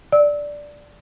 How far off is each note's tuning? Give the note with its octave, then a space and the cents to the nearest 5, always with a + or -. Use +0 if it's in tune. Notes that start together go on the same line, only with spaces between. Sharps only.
D5 +0 E6 -25